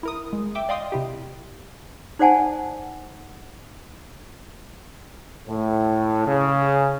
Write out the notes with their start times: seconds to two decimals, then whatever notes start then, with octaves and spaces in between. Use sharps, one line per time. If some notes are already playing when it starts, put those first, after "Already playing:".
0.03 E4 A#4 D#6
0.33 G#3
0.55 E5 G5 D6
0.69 D5 D#5 F5 G5 C6 D#6
0.92 C3 E4 G4
2.19 D#4 C5 D5 F#5 G#5 A5
5.48 A2
6.26 C#3